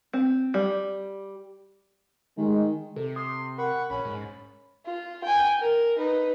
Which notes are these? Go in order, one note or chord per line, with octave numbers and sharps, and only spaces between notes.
C4
G3
D#3 G#3
C3 A4
C6 D#6
A#4 F#5 B5 C#6
A#1 C#4 B5
G#2
F4
G5 G#5
A#4
D#4 B4